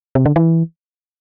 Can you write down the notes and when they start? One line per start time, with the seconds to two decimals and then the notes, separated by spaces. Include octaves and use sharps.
0.15 C3
0.26 D3
0.36 E3